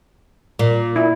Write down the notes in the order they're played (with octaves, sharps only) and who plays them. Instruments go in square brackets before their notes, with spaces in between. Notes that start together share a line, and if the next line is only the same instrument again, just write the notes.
[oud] A#2
[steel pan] E4